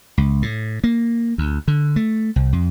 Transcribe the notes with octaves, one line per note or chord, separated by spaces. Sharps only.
C#2
A2
A#3
D2
D3
A3
C2
F2